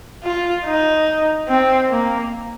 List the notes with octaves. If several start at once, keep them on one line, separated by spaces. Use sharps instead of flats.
F4
D#4
C4
A#3